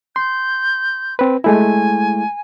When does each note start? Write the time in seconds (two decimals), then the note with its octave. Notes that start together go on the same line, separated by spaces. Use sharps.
0.16 C6 G6
1.19 C4 B4
1.44 G#3 A3 E4 G#5